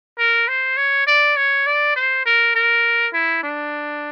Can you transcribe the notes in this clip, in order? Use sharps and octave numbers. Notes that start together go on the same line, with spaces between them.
A#4
C5
C#5
D5
C#5
D5
C5
A#4
A#4
E4
D4